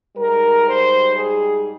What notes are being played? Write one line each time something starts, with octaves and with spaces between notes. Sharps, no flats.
G#2 G3 A#4
C5
G#4